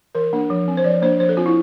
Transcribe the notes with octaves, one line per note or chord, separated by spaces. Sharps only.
E3 A#4
A#3 D4
F3
C4
C5
F3 D5
A#3 D4 C5
F3 C5
A4
C4 F4
E4